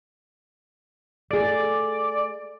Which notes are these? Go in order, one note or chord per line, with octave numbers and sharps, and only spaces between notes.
A3 G#4 D5